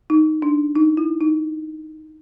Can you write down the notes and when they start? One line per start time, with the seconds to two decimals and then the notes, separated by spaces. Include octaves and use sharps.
0.10 D#4
0.42 D4
0.76 D#4
0.97 E4
1.21 D#4